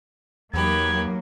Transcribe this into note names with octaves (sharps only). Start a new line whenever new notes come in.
E2 F#3 A#3 D#4 G4 B4 G#6